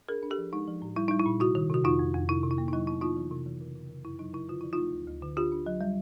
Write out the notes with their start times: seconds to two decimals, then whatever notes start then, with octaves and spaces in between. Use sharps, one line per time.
0.09 D4 G#4 A#4
0.23 D4
0.31 G4 A4
0.38 F3
0.53 G#3 D#4
0.68 F3
0.82 A2
0.96 G3 E4
1.08 G3 D#4
1.20 E4
1.26 A#2
1.40 C3 E4 F#4
1.55 D#3
1.70 C3 F#4
1.84 F2 D#4 F4
1.99 F2
2.14 F2
2.29 C3 E4
2.43 C3
2.51 E4
2.58 A#3
2.68 D#4
2.73 F#3 E4
2.87 B3 E4
3.02 B3 D#4 F4
3.16 E3
3.31 C3
3.46 E3
3.61 C#3
3.75 C#3
3.90 C#3
4.05 F#2 E4
4.19 F#3 D#4
4.33 C#3 E4
4.49 D3 F4
4.61 F3 E4
4.73 A3 D#4 F4
4.92 D2
5.07 D2
5.22 D3
5.36 D4 F4 G4
5.52 D4
5.66 F#3
5.81 G3